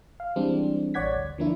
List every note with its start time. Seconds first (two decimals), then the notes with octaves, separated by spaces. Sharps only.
0.20 F5
0.36 E3 G3 G#3 C4 D4
0.94 A1 C#5 D5 F#5 G#6 B6
1.15 D2
1.38 D3 F3 A#3 D4 E4